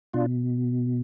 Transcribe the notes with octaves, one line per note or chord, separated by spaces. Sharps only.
B2 D4 F4